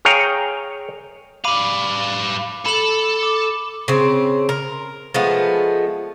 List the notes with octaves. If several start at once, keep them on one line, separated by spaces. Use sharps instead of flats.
G#4 C#5 F5 G5 A#5
G3 F5 B5 D6 D#7
A4 B5 E7 F#7
D6
C#3 C4
A#4
F3 G#3 A3 B3